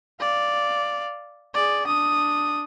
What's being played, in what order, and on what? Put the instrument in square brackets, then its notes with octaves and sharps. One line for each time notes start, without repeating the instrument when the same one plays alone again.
[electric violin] D5 F5
G#4 D5
D4 D#6